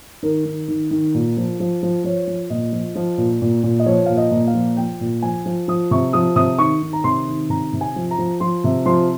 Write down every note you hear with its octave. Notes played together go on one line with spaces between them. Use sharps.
D#3 A#4
D#3
D#3
D#3
A#2
F3
F3
F3
F3 C#5
F3
A#2 D#5
F3
F3
A#2
A#2
A#2
D#5
F3 C#5
A#2 F5
D#5
A#2
F5
F3
F3 G5
A#2
F3 G#5
F3
F3 D#6
C3 C#6
F3 D#6
C3 D#6
D#3 C#6
D#3
A#5
C3 C6
D#3
C3 A#5
C3
G#5
F3
A#5
F3
F3 C6
C3
F3 C6